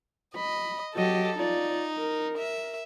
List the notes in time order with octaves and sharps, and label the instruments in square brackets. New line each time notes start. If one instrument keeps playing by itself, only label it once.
[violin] D#5 [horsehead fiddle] B5
[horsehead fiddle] F#3 D#5 [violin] G4 A4
[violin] D#4 [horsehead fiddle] F4 D5
[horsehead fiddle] A#4
[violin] E5